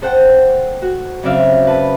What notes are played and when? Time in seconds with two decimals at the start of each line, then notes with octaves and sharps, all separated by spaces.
0.02 A4 C5 F#5 G5
0.82 F#4
1.23 F#2 C#3 C4 D5 E5 F5
1.67 B4 A5